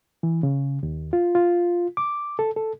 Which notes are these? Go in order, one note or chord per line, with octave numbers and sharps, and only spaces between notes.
E3
C#3
D#2
F4
F4
D6
A4
A4